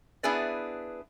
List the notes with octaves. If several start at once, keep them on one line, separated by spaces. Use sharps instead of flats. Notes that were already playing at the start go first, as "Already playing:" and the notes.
B3 D4 E4 G#4 B4 D5